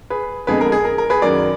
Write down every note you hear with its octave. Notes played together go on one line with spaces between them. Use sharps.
G#4 B4
F2 D3 G#3 B3 G#4 B4
A#4
G#4
A#4
A#4
G#4 B4
F#2 D#3 F#3 A#4 D5